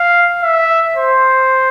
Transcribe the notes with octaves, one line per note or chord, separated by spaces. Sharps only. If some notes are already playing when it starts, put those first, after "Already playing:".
Already playing: F5
E5
C5